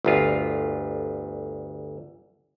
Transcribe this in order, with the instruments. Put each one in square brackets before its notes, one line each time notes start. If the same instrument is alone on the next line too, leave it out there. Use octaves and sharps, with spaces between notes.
[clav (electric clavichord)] G1 D2 F4